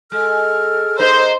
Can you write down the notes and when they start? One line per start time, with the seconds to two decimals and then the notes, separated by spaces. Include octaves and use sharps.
0.12 G#3 A4 F6
0.99 A#3 D#4 C5 G6